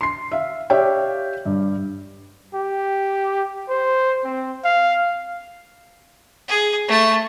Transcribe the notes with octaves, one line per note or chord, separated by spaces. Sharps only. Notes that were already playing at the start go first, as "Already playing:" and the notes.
C6 C7
E5 F5
G4 C#5 D5 E5 F5 G5
G2
G4
C5
C4
F5
G#4
A3 A5